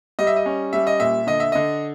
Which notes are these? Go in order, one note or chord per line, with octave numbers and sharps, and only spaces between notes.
G3 D#5
E5
D#5
C#4
G3 E5
D#5
A#2 E5
D3 D#5
E5
D3 D#5